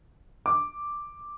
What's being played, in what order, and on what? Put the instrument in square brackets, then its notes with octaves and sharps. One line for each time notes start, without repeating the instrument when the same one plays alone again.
[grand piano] D6